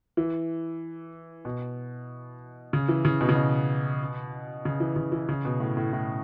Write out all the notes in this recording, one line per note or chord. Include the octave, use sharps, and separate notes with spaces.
E3
B2
C#3
E3
C#3
B2
C#3
B2
C#3
E3
C#3
E3
C#3
B2
A2
A2
A2